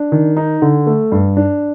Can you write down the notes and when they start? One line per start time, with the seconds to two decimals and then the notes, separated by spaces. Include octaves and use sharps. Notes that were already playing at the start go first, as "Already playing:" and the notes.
Already playing: D4
0.12 D#3
0.37 D#4
0.62 D3
0.87 A3
1.12 G2
1.37 D4